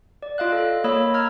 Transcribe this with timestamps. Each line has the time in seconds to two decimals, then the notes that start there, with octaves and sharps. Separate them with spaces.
0.22 D5
0.38 F4 D#5 F5 F#6
0.52 A4
0.84 A#3 C#5 D#5 B5 E6
1.14 A#5 E6 F6 G#6